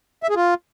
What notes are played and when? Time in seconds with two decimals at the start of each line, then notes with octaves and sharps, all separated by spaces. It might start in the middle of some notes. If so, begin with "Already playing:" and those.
0.23 E5
0.29 G#4
0.36 F4